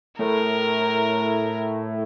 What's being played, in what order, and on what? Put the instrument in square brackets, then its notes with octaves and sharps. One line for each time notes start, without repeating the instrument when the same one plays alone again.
[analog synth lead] A2 [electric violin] A#4